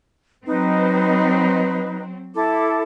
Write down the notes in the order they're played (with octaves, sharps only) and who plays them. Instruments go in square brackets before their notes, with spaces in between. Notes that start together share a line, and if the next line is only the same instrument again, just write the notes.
[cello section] F#3 C4 [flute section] D#4 B4
[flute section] E4 A4 D6